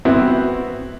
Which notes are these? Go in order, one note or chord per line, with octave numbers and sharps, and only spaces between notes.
B3 C4 E4 F#4